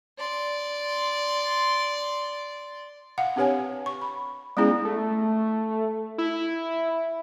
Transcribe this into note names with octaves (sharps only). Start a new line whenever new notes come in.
D5 C6
F5 F#5
C4 D4 G4 B4 C#5 G#5
C#6
B5
G#3 B3 C#4 E4 G#4
A3
E4